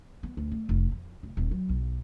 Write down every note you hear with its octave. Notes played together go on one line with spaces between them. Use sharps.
B3
D2
A3
F1
F2
F1
D#1
F#3
B1